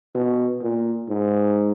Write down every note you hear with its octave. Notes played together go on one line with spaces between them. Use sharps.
B2
A#2
G#2